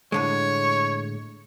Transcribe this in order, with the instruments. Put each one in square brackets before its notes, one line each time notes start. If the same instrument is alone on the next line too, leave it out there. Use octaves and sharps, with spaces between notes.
[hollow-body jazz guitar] A2 D3 G#3 [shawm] C#5